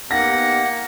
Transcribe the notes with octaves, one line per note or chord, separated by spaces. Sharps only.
A#3 B3 D#4 G4 F#5 A#6